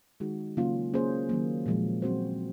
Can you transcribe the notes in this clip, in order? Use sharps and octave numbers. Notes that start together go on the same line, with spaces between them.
D#3 G#3 D#4 F#4
C#3 F#3 A#3 C#4 F4
A#3 C#4 G#4 C5
D#3 F#3 A#3
A#2 F3 G#3
A#2 F#3 C4 F#4 C5